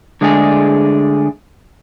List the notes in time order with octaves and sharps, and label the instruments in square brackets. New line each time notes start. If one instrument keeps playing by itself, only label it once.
[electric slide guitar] D3 G#3 A3 D4 G#4